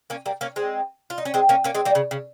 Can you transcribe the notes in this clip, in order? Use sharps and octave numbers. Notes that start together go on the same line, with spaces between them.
A#3 C#4
G3 A#3
A#3 C#4
G#3 C4
F4
D#4
C#4
G#3 C4
A#3 C#4
A#3 C#4
G#3 C4
G3 A#3
C#3
C#3